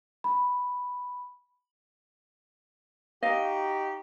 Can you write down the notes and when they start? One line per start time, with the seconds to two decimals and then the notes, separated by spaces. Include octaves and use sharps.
0.24 B5
3.23 D#4 F#4 G4 D#5 F5